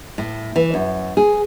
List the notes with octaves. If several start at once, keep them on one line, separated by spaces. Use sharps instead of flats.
A2
E3
F#2
G#4